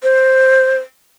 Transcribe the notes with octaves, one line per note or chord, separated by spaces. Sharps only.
C5